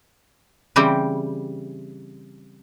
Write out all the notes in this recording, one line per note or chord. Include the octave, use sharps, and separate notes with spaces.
C#3 E3 G3 C4 G4